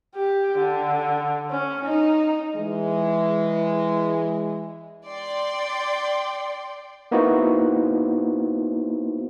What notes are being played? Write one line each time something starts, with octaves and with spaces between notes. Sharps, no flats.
G4
D3
C#4
D#4
E3 G#3
D5 G5 C6
A#3 B3 D#4 E4 F#4 C5